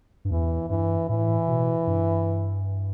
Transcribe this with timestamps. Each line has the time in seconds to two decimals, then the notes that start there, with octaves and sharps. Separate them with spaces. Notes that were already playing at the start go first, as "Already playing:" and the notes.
0.25 G2
0.31 E2 E3
0.70 G2 E3
1.09 A2 E3
1.48 B2
1.87 G2